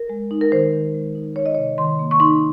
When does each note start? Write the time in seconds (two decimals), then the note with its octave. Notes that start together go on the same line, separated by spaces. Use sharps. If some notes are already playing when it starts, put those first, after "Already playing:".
Already playing: A#4
0.10 G#3
0.31 D#4
0.41 A#4
0.52 D#3 C5
0.73 D#3
0.94 G#3
1.15 D#4
1.36 D#4 C#5
1.46 D#5
1.55 C3 C#5
1.78 D#3 C6
1.99 A#3
2.11 C#6
2.20 D#4 C6